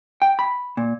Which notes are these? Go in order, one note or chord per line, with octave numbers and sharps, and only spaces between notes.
G5
B5
A#2